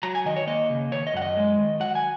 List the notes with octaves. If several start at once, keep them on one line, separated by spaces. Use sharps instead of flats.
F#3 A#5
G#5
D#3 D#5
C#5
A#3 D#5
C#3
D#3 C#5
D#5
F#2 F#5
D#5
G#3
D#3
F#3 F#5
G#5